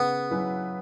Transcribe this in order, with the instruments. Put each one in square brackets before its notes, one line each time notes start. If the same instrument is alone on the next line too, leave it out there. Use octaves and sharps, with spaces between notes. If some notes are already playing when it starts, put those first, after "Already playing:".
Already playing: [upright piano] C#3 [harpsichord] B3
[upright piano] F#3 C#4 E4 B4